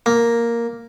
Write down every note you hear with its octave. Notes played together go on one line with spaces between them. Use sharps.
A#3